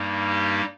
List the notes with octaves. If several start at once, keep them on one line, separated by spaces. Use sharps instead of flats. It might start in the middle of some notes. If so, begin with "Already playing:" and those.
Already playing: G2 G3 A#3 D#4
G4